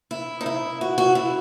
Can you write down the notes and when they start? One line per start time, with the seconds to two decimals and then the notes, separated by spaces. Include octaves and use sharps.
0.11 E4
0.41 D#4
0.46 E4
0.81 F#4
0.98 F#4
1.15 E4